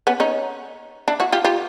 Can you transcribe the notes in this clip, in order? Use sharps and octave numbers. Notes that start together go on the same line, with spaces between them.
B3 C#4
C#4 D#4
D4 E4
E4 F#4
F4 G4
F4 G4